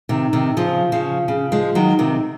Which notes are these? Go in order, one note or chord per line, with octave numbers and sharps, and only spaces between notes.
C3 D#3
C3 D#3
C#3 F3
C#3 F3
C#3
F3 G#3
D#3 F#3
C3 D#3